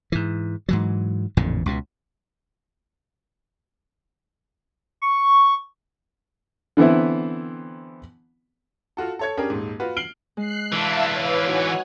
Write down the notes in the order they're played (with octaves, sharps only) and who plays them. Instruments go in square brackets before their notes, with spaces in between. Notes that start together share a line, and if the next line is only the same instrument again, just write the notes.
[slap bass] G#2 E3
G#2 E3 F#3
A1 F2 A#2 D3
C#2 B2
[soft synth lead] C#6
[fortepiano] D3 E3 B3 C4 E4
[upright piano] F4 F#4 A4
A4 C#5 G#6
C#4 D4 G4 G#4 A#4
D#1 G#2
F4 F#4 B4
F6 C7 D7 F#7 G7
[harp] G#3 [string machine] F#6 C7
[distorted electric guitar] E3 D4 [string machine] E5 F5 A5
[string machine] B4 F5 [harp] C#5
[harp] D#4 F#4 B4 [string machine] C#5 F#5 G#5